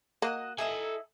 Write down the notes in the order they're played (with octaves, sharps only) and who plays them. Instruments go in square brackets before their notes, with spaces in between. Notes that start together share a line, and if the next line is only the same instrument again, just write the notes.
[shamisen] A#3 [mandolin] F#4 D#5 F#6
[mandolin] E4 D#5 E6 [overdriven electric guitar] A4 G#5